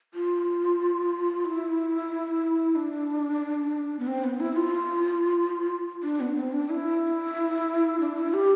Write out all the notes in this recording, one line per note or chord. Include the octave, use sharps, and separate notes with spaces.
F4
E4
D4
B3
C4
B3
E4
F4
D4
B3
C4
D4
E4
D4
E4
G4